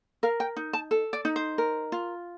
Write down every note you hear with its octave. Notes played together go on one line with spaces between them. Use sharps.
A#4 F5
G5
D#4
A5
A4
D5
D#4
C5
A#4
F4